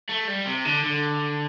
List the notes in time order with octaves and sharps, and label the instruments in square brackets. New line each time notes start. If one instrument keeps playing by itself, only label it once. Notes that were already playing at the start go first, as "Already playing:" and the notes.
[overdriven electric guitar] A3
G3
C3
D3
D3